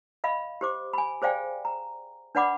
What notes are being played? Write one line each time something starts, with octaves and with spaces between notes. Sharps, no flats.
D#5 F5 B5
G4 C5 D6
G#5 B5
G#4 C5 D5 F5 G5 G#5
A#5
D4 B4 D5 F#5 B5 D6